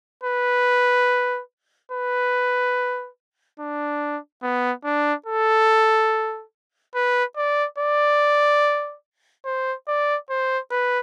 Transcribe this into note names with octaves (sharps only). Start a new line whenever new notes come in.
B4
B4
D4
B3
D4
A4
B4
D5
D5
C5
D5
C5
B4